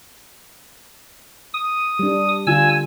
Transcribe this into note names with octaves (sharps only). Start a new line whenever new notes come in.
D#6
G3 D4
D3 F4 G#5 E6